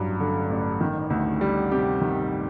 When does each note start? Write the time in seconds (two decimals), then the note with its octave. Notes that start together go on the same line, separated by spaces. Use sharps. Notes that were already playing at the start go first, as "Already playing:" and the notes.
Already playing: A1 G2 F#3
0.20 D3
0.50 A1
0.80 D#3
1.10 D2
1.41 G3
1.72 C3 G4
2.01 D#3